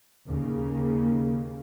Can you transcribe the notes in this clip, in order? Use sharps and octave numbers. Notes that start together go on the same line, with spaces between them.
D#2 C#3 A#3